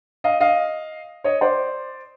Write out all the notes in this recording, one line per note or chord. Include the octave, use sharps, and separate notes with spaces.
D#5 F5
D#5 F5
C#5 D#5
C5 D5